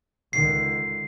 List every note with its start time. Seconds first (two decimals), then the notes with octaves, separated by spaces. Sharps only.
0.33 C#2 D3 D#3 C7